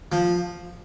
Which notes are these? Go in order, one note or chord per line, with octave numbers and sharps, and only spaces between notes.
F3